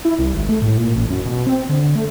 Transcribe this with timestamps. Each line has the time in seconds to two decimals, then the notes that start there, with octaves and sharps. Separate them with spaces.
0.05 E4
0.19 C2
0.34 G#1
0.49 A3
0.62 A2
0.77 A#2
0.96 A1
1.10 F#2
1.26 B2
1.47 C4
1.69 D3
1.95 A3